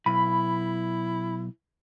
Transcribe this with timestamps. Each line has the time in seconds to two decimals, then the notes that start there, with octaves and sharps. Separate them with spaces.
0.06 B1 E4 B5